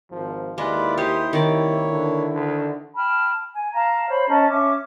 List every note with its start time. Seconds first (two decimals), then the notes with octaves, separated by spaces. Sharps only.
0.11 G#1 F3
0.58 D#2 G#3 E4 F4 B4 D5
0.98 G4 C5 C#5 C6 D#6
1.33 C2 D#3 A#3 C#5 D5
1.90 D3
2.32 D3
2.94 G5 A5 B5 F6
3.54 G#5
3.73 F5 A5 A#5
4.08 C5 C#5 B5
4.28 C#4 D#5 A5 A#5
4.49 C#4 E5 D6